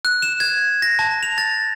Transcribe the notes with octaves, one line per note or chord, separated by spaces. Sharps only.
F#6
E7
G#6
A#6
A5
F7
A6